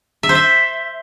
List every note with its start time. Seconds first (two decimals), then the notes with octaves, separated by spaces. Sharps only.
0.23 E5
0.29 C5
0.35 E5